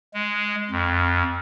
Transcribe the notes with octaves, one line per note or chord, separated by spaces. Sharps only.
G#3
F2